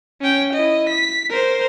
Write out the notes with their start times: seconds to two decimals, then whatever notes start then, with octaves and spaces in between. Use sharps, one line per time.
0.21 C#4 G5
0.54 E4 D#5
0.89 B6
1.30 A#4 C5